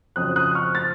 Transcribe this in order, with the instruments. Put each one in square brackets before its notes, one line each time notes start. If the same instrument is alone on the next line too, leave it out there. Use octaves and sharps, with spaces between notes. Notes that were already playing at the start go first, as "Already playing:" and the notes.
[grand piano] F2 C#3 F#3 D#6 F#6
D#6 F#6
C#6 F6
F6 A6